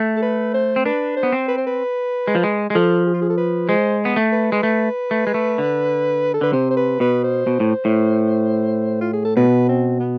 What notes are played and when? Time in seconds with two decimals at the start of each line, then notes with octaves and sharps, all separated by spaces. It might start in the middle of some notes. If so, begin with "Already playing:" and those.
Already playing: A3
0.17 A4
0.22 B4
0.54 C5
0.76 C4
0.85 D4 B4
1.17 C5
1.23 B3
1.33 C4
1.48 B4
1.58 C5
1.67 B4
2.28 G#3
2.35 F3
2.43 G#3
2.70 G#3
2.74 F3 A4
3.06 G#4
3.14 F4
3.22 G#4
3.30 A4
3.38 B4
3.69 G#3 C5
4.05 B3
4.16 A3
4.32 B4
4.52 G#3
4.63 A3
5.11 A3
5.27 G#3
5.34 A3
5.58 D3
6.34 A4
6.41 D3 B4
6.53 C3 C5
6.70 C5
6.77 B4
7.00 B2 B4
7.24 C5
7.47 B2
7.60 A2
7.85 A2
9.01 F4
9.13 G#4
9.25 A4
9.37 B2 B4
9.68 C4
10.00 B3